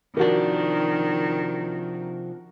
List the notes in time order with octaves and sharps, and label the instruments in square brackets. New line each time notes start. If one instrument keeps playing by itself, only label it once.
[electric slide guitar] C3 F3 D4 [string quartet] D#3 [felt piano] F#4 A#4